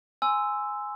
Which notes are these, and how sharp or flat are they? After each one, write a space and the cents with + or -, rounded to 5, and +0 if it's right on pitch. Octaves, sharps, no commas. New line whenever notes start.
G#5 +0 C6 -15 E6 +0